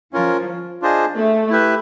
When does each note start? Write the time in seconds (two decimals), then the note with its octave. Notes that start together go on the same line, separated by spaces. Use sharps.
0.13 F3 C#4 F4 A#4
0.82 D4 F4 G#4 C5 D#5
1.16 A3
1.50 E4 G4 B4 E5